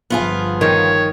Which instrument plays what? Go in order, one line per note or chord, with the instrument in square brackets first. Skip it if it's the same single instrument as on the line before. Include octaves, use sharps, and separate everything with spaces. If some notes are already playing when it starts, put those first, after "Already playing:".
[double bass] G1 F3 [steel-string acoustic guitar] B3 F4 G#4
[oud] D#3 [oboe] C#5